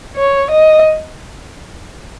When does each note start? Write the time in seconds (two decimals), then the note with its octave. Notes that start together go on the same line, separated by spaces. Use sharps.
0.17 C#5
0.51 D#5